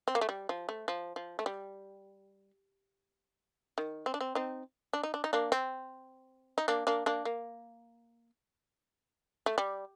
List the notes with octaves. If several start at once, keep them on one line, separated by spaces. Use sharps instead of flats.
C4
A#3
A3
G3
F3
A3
F3
F3
A3
G3
D#3
C4
D4
C4
C4 D#4
D4
D#4
D4
D#4
A#3 D4
C4
D#4
A#3 D4
A#3 D4
A#3 D4
A#3
A3
G3